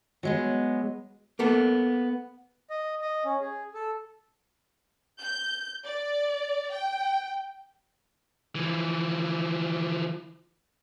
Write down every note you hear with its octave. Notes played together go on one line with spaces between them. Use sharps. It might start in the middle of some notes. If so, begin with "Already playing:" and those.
F#3 G#3 B3
A#3 B3 A4
D#5
D#5
C#4
G#4
A4
G6
D5
G5
E3 F3